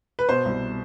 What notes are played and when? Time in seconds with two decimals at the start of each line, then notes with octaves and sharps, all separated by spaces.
0.19 B4
0.29 B2 C5
0.45 C2